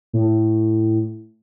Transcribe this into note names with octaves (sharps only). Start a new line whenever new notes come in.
A2